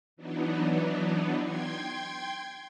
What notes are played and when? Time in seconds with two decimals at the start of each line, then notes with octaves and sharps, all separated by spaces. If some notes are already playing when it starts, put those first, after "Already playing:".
0.17 E3 F#3 B3 D4 D#4
1.41 G5 C6 G#6